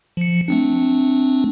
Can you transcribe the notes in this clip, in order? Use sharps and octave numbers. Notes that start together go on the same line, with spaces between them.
F3 C#7
A3 C4 D4